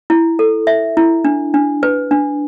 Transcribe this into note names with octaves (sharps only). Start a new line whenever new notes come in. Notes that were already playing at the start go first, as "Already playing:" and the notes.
E4
A4
E5
E4
D4
D4
B4
D4